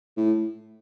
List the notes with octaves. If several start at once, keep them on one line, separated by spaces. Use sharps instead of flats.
A2